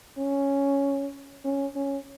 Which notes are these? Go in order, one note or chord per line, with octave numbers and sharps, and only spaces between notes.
C#4
C#4
C#4